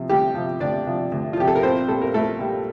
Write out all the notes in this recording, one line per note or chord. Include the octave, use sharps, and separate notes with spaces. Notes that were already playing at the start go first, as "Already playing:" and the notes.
Already playing: C3 F3
D2 G3 G4
C3 F3
D2 D4 D5
C3 F3
D2
F4
C3 F3 G4
A4
A#4
A#1 C4 C5
A#2 G3 A4
A#4
A#1 A3 A4
A#2 G3